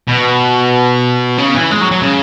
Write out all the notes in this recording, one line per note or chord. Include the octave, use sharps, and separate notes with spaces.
B2
C#3
E3
G#3
F#3
F#3
C#3